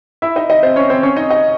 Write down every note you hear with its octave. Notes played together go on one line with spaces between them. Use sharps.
E4 E5
D#4 D#5
D#4 D#5
C4 C5
C#4 C#5
C4 C5
C#4 C#5
D#4 D#5
D#4 D#5